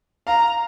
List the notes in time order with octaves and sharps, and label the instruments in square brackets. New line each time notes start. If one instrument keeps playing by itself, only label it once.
[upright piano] F5 [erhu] A#5